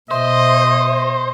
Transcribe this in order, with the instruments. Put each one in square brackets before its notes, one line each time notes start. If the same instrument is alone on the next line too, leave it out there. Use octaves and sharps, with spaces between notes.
[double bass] B2 [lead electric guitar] C5 [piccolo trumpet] D#5 [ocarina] E5